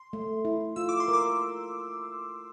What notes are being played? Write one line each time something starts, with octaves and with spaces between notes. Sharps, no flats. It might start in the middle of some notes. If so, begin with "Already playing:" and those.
Already playing: C6
A3
E4
F4 E6
D6
C6
A#4
D6